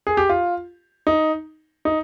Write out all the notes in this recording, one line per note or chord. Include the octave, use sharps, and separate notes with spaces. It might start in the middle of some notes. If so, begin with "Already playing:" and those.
G#4
G4
F4
D#4
D#4